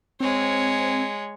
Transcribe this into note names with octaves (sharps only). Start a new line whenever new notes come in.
G#3 C4 C#5